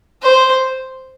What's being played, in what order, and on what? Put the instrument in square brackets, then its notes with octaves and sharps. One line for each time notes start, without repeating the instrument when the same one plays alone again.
[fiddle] C5